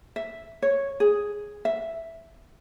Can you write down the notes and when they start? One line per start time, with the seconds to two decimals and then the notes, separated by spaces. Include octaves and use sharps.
0.16 E5
0.62 C#5
1.00 G#4
1.65 E5